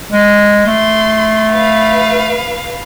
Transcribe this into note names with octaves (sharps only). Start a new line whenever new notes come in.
G#3
A3 C6
B4 F5